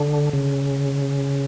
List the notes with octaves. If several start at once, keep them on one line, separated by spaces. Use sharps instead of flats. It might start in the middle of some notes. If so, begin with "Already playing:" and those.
Already playing: D3
C#3